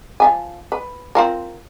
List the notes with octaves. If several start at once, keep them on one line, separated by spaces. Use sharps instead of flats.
F3 E5 G#5
B4
C4 F4 A#4